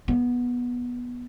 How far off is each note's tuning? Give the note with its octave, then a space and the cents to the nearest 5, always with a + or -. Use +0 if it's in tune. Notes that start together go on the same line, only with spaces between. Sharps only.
B3 -15